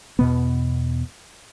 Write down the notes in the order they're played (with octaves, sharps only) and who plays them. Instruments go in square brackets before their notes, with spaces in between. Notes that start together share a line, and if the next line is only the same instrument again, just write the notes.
[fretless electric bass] E2 B2 B3